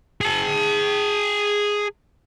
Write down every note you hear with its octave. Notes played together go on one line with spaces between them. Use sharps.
G#4 A5